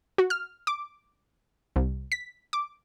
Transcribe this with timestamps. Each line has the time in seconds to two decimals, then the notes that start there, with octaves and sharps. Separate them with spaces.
0.18 F#4
0.30 F6
0.67 D6
1.76 C2
2.12 B6
2.53 D6